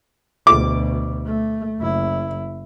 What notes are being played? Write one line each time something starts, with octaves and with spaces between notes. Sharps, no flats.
D2 B2 D6
A3
F#1 E4